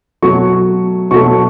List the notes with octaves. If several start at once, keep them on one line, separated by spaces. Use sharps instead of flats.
B2 F#3 A3 C#6
B2 F#3 A3 C#6